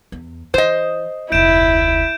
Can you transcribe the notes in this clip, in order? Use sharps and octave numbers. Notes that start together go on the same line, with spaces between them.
E2
E3 C5 D#5
F1 D2 E4 G6 D7 E7